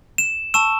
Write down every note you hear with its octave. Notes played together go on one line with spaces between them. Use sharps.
E7
A5 C#6 E6 E7